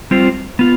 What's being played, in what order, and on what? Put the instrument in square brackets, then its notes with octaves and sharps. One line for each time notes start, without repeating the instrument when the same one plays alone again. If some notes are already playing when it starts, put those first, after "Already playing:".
[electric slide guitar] G3 C4 F4 C5
B3 F4